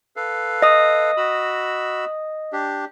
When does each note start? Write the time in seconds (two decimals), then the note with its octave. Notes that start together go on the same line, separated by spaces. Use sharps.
0.16 A4 B4 F5
0.62 D#5 D#6
1.17 F#4 B5 E6
2.53 D4 G4